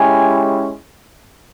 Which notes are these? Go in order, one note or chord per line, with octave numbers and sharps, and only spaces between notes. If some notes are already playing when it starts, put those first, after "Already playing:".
Already playing: G#3 C#4 E4 G4 G#5